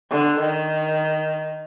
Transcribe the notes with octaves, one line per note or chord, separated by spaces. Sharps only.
D3
D#3